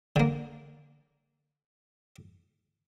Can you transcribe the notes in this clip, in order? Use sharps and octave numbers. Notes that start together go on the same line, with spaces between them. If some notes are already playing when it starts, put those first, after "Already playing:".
D3 A#3